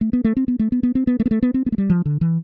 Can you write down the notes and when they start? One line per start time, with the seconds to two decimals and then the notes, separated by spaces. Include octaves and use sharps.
0.01 A3
0.13 B3
0.24 A3
0.37 C4
0.48 B3
0.59 A3
0.72 B3
0.83 B3
0.95 C4
1.07 B3
1.20 A3
1.26 B3
1.31 A3
1.43 B3
1.54 C4
1.66 B3
1.72 A3
1.78 G3
1.90 F3
2.06 D3
2.21 E3